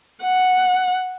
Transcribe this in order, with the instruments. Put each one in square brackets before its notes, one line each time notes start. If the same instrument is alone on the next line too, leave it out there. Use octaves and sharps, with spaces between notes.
[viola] F#5